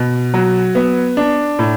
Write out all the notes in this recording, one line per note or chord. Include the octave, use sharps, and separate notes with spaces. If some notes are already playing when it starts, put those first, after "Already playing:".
Already playing: B2
F#3
B3
D4
A2